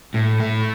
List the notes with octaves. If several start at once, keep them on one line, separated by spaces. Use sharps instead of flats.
A2
A3